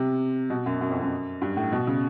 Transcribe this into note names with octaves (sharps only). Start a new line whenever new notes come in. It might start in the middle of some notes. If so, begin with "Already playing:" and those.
Already playing: C3
B2
F#2
F#2
F2
F#2
G2
A2
B2
C#3